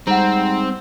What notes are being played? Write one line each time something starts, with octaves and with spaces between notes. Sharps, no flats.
G#2 G3 C4 F#5 A#5